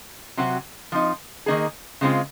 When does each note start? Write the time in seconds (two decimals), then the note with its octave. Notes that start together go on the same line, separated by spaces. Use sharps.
0.37 C3 F#3 C4 F#4
0.92 F3 C4 D#4
1.46 D#3 A#3 D#4 G#4
2.01 C#3 G#3 C4 F4